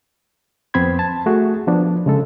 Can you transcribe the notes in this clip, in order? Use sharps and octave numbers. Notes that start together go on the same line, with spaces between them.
F2 B3 C4 B5 C6 G#6
A5
A3 F#4 G#4
F3 B3 D4
C#3 G#3 A4